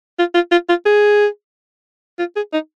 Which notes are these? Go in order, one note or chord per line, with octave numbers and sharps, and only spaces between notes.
F4
F4
F4
F4
G#4
F4
G#4
D#4